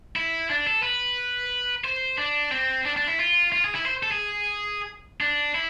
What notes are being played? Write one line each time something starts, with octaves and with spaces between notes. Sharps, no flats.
E4
D4
A4
B4
C5
D4
C4
D4
D4
E4
F4
F4
G#4
E4
C5
A4
G#4
D4
E4